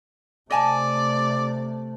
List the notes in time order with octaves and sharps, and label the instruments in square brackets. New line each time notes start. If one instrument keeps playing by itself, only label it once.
[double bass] C3 A3 [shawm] D5 [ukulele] D#5 G#5 A5